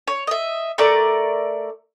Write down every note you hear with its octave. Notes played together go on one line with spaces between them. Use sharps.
C#5
D#5 E5
A3 A#4 D5